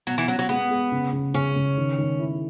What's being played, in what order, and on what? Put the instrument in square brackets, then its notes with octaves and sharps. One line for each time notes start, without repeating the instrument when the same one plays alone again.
[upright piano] B2 [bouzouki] F#3
[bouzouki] E3
[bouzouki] F#3 [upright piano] C#4
[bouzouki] F#3
[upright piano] G#3 [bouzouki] B3
[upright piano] G#3
C#3
C#3
[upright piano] C#3 [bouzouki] C#4
[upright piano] C#3
D#3
D#3
E4